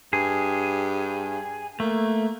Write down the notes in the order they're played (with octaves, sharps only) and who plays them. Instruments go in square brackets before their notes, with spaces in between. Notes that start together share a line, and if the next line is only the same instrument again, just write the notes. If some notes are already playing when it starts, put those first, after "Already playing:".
[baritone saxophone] G2 [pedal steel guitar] G#4
[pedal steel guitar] A3 [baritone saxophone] A#3